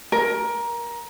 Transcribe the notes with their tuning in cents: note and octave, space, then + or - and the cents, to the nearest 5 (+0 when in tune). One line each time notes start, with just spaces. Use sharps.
A#4 +20